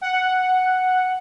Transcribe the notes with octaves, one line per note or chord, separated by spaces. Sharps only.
F#5